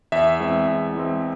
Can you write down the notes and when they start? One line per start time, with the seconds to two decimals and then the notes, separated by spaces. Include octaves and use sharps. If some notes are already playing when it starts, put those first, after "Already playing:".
0.12 E2 E5
0.40 E3 G#3 C4
0.68 E2
0.95 E3 G#3 C4